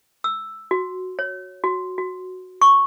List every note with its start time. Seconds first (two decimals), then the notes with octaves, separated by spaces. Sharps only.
0.24 E6
0.71 F#4
1.19 C#5
1.64 F#4
1.98 F#4
2.62 C#6